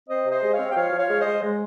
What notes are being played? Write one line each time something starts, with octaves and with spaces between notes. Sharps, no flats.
C4 C5 D#5
C3
C5 D#5
G#3
C#5 F5
C4
G5
F3 C#5 F5
F3
C#5 F5
G#3
C5 D#5
G#3
G#3